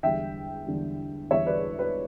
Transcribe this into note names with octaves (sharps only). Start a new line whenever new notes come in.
E2 D3 G3 E5 G5
E2 D3 G3
E2 D3 G3 C#5 E5
B4 D5
B4